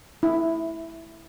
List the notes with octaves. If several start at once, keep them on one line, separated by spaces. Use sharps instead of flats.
E4